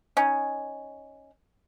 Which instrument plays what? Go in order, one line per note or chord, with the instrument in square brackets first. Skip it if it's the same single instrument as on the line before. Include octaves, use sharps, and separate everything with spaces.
[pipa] C#4 D#4